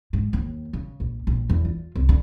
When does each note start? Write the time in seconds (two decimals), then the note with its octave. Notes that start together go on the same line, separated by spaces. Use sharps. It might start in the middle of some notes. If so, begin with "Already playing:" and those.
0.13 G#2
0.33 D#2
0.73 C#3
1.00 A#1
1.27 A#1
1.50 E2
1.65 F4
1.95 C2
2.09 D3